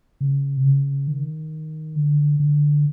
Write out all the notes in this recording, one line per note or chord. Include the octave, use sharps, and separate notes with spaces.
C#3
C3
C#3
D#3
D3
D3